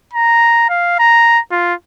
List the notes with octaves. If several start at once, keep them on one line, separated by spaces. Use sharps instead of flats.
A#5
F5
A#5
F4